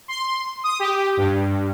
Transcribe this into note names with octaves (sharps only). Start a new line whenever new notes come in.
C6
D#6
G4
G2